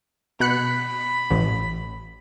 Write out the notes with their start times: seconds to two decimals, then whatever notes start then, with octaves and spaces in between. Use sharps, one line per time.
0.40 B2 B5 F#6 C#7
1.30 A1